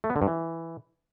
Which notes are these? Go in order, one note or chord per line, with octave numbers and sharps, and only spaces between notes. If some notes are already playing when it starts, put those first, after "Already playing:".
A3
B3
D3
G2
E3